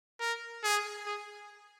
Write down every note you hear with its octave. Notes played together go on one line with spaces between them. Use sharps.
A#4
G#4
G#4